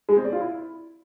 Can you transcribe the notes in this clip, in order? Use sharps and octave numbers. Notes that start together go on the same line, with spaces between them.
G#3
C4
D5
F4
E4